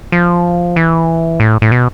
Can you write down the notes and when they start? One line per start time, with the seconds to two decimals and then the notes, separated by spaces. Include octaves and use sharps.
0.12 F3
0.76 E3
1.40 A2
1.62 A2
1.72 B2